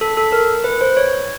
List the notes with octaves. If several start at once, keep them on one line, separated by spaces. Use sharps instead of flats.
A4
A4
A#4
B4
C5
C#5